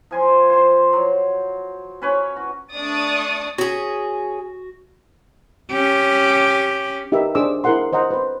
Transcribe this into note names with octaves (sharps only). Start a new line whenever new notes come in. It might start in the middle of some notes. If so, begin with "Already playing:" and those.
F3 G#5 C6
C5 C6
F#3
C#4 B4 C#5
F#4
A3 D4 D5 C#6 D#6 A6
C#4 F#4 G#4
C#4 G4
D#4 G4 A#4 B4 E5
D4 G#4 C5 D6 E6
E4 G#4 A#4 C5 F#5 C6
C5 D#5 F#5 A#5
B4 C5